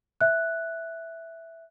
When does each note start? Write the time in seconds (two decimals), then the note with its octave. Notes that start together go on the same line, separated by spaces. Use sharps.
0.21 E5 F#6